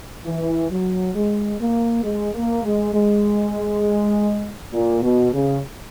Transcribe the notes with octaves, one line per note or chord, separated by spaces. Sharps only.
E3
F#3
G#3
A#3
G#3
A#3
G#3
G#3
A#2
B2
C#3